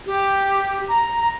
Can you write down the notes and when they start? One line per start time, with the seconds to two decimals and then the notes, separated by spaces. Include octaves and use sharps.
0.06 G4
0.89 A#5